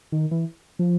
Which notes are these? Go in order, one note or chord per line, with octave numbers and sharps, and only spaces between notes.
D#3
E3
F3